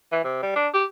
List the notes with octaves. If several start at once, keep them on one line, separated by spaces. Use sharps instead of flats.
E3
C3
G3
D4
G4